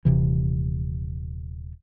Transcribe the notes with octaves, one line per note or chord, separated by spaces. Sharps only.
D#1 C3 E3